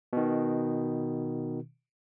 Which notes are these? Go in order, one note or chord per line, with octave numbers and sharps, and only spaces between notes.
B2 D#3